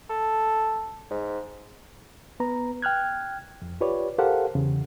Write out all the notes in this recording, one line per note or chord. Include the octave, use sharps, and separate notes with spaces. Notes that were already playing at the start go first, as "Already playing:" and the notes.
A4
G#2
B3 B4 A#5
G5 F6 F#6 G#6
F2
F4 G4 B4 C#5 D5
G4 A4 A#4 C5 F5 F#5
E2 C#3